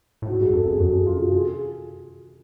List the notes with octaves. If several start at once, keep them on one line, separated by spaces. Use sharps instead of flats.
A2
G#2 F#4
G#2 G#4
F#2 A4
F2 G#4
F#2 F#4
F2
F#2 G#4
F4
F#4
G#4